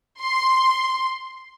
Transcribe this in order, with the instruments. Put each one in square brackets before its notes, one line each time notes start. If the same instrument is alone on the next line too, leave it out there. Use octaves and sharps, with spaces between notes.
[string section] C6